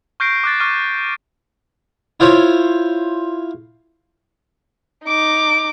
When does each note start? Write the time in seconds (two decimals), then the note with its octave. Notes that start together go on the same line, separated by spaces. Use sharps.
0.20 C#6 F6 G6 A#6 C7 D7
0.44 D6 F#6 A6
0.60 C#6 D6 F6 C7 D#7
2.20 E4 F4 C5 C#5
5.05 D#4 D6